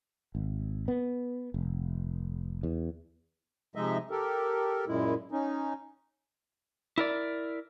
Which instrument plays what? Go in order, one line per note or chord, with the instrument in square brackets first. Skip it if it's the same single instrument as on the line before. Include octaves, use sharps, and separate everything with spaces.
[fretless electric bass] G#1
B3
F1
E2
[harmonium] C3 F3 G#3 D#4 D#5 E5
G4 A4 A#4
F#2 A#2 G#3 E4
C#4 D#4
[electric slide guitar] E4 A#4 D5